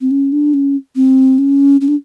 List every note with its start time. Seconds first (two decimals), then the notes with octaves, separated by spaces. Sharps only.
0.01 C4
0.11 C#4
0.32 D4
0.54 C#4
0.96 C4
1.38 C#4
1.81 C#4
1.88 D4